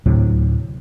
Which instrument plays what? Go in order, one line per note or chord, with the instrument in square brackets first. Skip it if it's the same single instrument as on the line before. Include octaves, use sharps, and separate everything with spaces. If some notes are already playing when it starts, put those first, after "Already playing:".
[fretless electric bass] D2 A2 C3 F#3